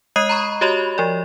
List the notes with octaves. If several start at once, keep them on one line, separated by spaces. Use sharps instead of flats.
G#3 D#5 D#6 F#6 C7 D#7
A#5 B5 C#6
F#4 G4 C#5 D#5 B5 F7
F3 D5